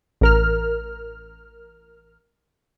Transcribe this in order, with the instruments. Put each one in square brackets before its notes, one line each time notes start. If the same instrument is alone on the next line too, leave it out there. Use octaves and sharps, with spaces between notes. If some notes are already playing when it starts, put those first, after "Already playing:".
[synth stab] A1 A#4 F6